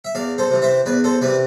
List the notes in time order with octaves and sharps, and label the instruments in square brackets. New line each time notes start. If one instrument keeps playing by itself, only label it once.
[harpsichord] E5
E2 D5 F5
A4 C5
C3 E3
C5 E5
E2 B4 D5
A4 C5
C3 E3 B4 D5